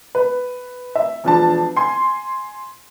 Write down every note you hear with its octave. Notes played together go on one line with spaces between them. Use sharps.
B4
E5
E1 F3 D4 A5
G#5 C6